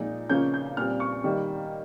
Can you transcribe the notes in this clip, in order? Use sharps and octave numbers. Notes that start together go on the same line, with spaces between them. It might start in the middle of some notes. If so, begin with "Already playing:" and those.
Already playing: A#2 F3 G#3 D#4
C#3 F3 A#3 C#4 G6
G6
A#2 G3 C4 F6
C#6
D#3 G3 A#3